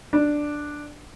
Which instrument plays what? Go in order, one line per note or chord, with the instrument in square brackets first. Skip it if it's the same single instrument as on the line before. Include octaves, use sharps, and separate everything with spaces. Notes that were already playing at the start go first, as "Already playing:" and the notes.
[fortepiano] D4